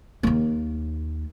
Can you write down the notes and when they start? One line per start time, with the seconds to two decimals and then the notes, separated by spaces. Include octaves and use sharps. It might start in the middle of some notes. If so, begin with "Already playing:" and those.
0.23 D#2 A#3